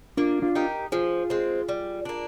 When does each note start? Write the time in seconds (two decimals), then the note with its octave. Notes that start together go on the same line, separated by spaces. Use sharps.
0.17 A#3 D4 F4
0.42 D4 F4
0.55 D#4 G4 A#4
0.92 F3 F4 G#4
1.30 G#3 C4
1.69 G3
2.05 A#3 D4